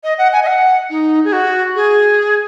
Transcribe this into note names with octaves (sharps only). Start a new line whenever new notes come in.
D#5
F#5
G#5
D#5
F#5
D#4
G#4
F#4
G#4